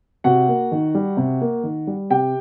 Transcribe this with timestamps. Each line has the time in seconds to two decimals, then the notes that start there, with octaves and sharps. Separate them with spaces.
0.24 C3 F#4 F#5
0.48 A#3
0.72 D#3
0.95 G3
1.17 C3
1.41 A#3
1.63 D#3
1.87 G3
2.10 C3 G4 G5